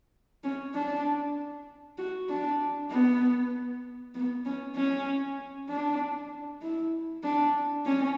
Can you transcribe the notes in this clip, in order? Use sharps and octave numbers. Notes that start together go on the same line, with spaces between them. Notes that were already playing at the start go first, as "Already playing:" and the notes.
C#4
D4
F#4
D4
B3
B3
C#4
C#4
D4
E4
D4
C#4